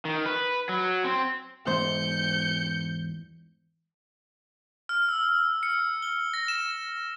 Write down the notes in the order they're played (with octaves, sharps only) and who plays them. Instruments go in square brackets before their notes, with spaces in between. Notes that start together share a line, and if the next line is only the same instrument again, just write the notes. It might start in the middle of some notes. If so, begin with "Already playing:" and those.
[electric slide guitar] D#3
B4
F#3
C4
[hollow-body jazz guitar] E2 G#2 C5 [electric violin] G6 C#7
[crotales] F6
E6
C#7
G7
A#6
E7